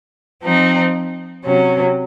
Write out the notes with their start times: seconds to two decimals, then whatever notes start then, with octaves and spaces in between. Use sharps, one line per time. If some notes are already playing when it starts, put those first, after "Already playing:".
0.42 F3 C4 D#4
1.44 C3 F#3 C#4